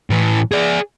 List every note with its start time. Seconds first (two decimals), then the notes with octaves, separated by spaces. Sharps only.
0.10 A2 E3
0.52 G#4 D5